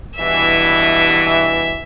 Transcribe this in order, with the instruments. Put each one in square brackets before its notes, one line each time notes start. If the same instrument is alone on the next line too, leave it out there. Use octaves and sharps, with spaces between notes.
[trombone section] G2 B2 E3 [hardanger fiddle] E5